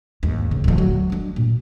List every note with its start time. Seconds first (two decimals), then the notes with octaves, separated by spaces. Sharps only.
0.23 D#2 G#2
0.51 D1 C#3
0.64 D1 F3
0.78 F#3
1.10 G#3 D4
1.36 A#2